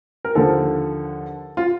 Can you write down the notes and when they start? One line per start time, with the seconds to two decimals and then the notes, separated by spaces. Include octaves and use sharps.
0.25 A#4
0.35 D#2 D3 F3 A4
1.57 F4